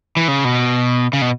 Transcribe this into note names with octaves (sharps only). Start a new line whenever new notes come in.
E3
C#3
B2
C#3
B2